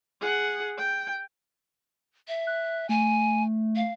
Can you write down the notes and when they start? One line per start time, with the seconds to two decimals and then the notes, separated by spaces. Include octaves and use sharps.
0.21 G#4 F#5
0.78 G5
2.28 E5
2.47 F#6
2.89 A3 G#5
3.76 F5